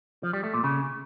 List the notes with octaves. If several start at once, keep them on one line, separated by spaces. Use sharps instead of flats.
F3
G3
A3
A#2
C#3